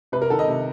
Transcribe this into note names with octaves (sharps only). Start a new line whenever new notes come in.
C3 B4
A#4
D#3 A4
D#5
C3